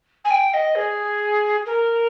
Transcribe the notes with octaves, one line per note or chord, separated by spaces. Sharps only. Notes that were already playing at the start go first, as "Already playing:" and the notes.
G#5
G5
D#5
G#4
A#4